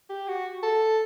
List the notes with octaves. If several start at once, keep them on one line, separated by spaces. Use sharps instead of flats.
G4
F#4
A4